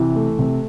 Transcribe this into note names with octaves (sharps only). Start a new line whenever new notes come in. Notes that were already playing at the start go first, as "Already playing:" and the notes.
Already playing: C3 E3
A3
C3